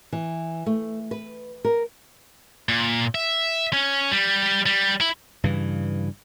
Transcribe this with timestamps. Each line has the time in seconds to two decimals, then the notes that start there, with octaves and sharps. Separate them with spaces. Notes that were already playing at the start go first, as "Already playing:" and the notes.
0.12 E3
0.66 A3
1.11 B4
1.65 A#4
2.69 A#2
3.15 E5
3.73 C#4
4.11 G3
4.66 G3
5.01 E4
5.44 G2 C#3 E3